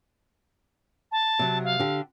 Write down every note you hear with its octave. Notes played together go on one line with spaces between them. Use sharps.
A5
C3 F#3
F5
D3 G4